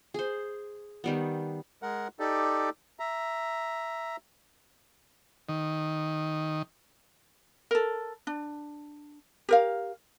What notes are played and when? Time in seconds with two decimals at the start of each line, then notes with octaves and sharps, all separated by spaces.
0.14 G#4 C5
1.04 D#3 G3 B3
1.82 G#3 A#4 F#5
2.20 D#4 G4 A4 D5
2.99 E5 A#5
5.49 D#3
7.71 A4 A#4
8.27 D4
9.49 G4 A#4 F5